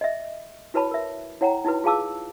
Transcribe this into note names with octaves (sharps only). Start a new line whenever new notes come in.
D#5 E5
E4 F#4 B4 C#5 A5 B5
A#4 E5
E4 C#5 F#5 G5 A#5
D#4 E4 F#4 B4
F4 G#4 F5 A5 D6 E6